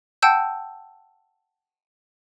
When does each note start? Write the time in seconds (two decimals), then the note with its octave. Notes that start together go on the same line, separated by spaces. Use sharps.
0.22 F#5 G5 A5 E6 G6